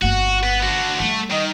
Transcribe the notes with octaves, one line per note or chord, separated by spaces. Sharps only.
G1 A#3 F#4 F#5
B3 B4
D3 F#4
G3 A3
D#3 D#5